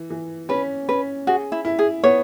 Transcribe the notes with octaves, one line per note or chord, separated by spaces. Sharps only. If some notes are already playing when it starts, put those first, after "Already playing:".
Already playing: E3
E3
C#4 B4
C#4 B4
F#4 G#4
E4
E4
G#4
B3 C#5